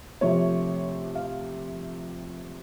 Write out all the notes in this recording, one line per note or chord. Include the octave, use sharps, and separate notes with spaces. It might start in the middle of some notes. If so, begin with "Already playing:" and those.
C3 F3 A3 C#5
F5